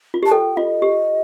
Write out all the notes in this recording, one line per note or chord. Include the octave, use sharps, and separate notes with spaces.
F4
G4 A5
A4 G5
F4 D#5
G4